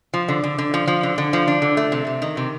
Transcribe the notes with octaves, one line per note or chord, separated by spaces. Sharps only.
F3
D3
D3
D3
F3
F3
D3
D3
F3
D4
D3
A3
C3
C3
D#3
C3